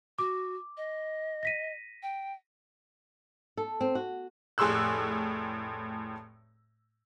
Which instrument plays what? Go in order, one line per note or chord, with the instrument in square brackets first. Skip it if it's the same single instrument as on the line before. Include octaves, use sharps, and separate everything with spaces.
[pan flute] F#4 [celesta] D6
[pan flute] D#5
[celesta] A#6 B6 D#7
[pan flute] G5
[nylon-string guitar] A4
C4
F#4
[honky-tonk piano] F1 A2 G#4 C6 E6 F#6